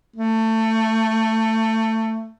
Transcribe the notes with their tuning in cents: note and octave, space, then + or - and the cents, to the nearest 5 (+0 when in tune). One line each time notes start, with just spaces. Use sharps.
A3 +20